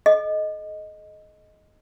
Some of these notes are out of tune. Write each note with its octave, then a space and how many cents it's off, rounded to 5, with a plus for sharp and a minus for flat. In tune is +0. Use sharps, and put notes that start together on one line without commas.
A4 -40 D#5 +0